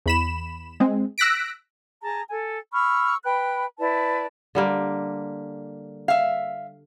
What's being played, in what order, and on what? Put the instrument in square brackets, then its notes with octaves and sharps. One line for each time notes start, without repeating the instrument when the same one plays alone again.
[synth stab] E2 B5 E7
G#3 C4
E6 F#6 A#6 B6 D7
[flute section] G#4 A5 A#5
A4 G#5
B5 C#6 E6 F6
B4 G5 B5 F#6
E4 B4 D5 A5
[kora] D3 G3 A#3
[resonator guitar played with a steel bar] E5 F5